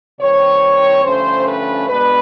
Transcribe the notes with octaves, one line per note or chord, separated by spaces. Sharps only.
C3 D#3 G3 C4 C#5
G2 D3 F3 A3 C#4 C5
B4
B2 G#3 B3 D4 B4